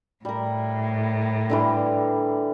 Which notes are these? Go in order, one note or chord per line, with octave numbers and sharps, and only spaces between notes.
A2 G3 A#4
D3 E3 G3